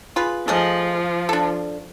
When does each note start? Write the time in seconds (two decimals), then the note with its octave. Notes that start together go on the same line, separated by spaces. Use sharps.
0.16 F4 G#4 B4
0.48 F3 A3 G#4 D#5
1.29 D4 A4